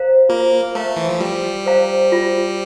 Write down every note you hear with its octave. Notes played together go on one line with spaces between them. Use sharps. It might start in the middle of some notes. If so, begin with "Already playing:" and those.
Already playing: C5 F5 A#5
A#3 F4
A3 C5 F5 A#5
E3
F3
G3 F4
C5 F5 A#5
F4